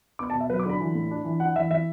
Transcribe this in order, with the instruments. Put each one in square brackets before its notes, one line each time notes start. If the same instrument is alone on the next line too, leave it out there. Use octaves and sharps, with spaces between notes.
[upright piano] B3 D6
B2 A5
E5
F#3 B4
D6
D3 B5
E3
A2
D4
E3
D4 F#5
E3 E5
E3 E5